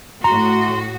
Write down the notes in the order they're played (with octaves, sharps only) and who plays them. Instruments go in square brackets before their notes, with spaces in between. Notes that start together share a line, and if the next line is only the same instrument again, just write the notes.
[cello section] A2 F#4 [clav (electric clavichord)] A#5 [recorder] C6